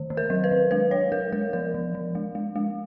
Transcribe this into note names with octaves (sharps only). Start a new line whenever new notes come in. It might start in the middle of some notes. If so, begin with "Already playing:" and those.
Already playing: D#3
D#3
A#4
F#3
B4
F#3
G#3 B4
G#3 C#5
G#3 A#4
G#3 A#4
F3 A#4
F3
F3
G#3
G#3
G#3